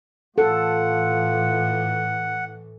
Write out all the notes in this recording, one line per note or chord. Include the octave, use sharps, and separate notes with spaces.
A2 E3 F4 A4 F#5